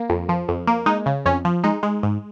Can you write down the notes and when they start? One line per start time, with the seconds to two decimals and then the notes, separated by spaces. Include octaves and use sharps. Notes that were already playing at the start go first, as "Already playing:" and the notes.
Already playing: A#3
0.10 F2
0.29 F3
0.49 F2
0.67 A#3
0.86 G#3 D#4
1.06 C#3
1.26 F2 C#4
1.45 F3
1.64 G#3 D#4
1.83 G#3
2.03 G#2